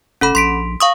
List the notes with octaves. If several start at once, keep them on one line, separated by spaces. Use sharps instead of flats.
F1 C#4 A4 B5
A#1 C6 B6 D7
F5 C#6 D#6